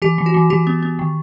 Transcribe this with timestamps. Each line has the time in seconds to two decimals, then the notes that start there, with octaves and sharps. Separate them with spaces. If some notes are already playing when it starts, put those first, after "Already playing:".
0.02 E3 G4
0.18 E3
0.26 F#4
0.34 E3
0.50 E3 G4
0.67 B3
0.82 B3
0.99 D#3